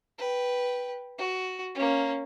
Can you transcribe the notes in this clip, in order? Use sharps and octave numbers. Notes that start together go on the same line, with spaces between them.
B4 G5
F#4
A#3 C#4